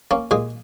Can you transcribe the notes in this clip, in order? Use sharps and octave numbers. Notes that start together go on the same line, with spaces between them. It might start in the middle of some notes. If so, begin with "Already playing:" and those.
A#3 C#4
A#2 G#3 G#4